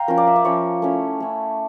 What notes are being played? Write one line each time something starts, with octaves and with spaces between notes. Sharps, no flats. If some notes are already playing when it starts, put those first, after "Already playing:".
Already playing: F5 G5 A#5
F3 C#4 F4 A#4
D5
E5
D5
F3 C#4 F4 C#5
A3 C#4 E4
A3 C#4 E4